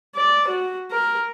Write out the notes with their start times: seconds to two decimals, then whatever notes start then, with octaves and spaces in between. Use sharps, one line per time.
0.16 D5
0.48 F#4
0.91 A#4